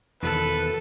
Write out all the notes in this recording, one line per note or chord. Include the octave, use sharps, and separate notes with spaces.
E2 B2 D#3 A4 B4